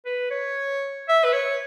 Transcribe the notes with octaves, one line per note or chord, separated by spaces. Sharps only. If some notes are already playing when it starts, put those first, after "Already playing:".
B4
C#5
E5
B4
C#5